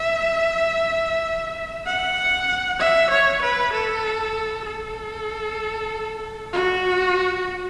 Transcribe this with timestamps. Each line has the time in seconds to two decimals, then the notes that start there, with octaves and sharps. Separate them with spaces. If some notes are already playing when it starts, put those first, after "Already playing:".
Already playing: E5
1.87 F#5
2.79 E5
3.11 C#5
3.42 B4
3.73 A4
4.66 A4
6.53 F#4